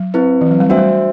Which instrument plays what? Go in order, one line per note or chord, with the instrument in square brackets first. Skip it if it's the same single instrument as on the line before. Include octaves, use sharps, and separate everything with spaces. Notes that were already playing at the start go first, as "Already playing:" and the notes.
Already playing: [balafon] F#3
[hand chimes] C4 E4 B4
[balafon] E3
F#3
G3
[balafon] A3 [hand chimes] D4 F#4 C5 E5
[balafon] G3